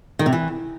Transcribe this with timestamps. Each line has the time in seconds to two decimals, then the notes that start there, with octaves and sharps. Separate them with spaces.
0.19 D#3
0.26 C3
0.33 E3